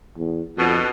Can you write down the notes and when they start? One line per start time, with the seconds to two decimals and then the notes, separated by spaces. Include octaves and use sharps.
0.18 E2
0.57 F2 B2 D3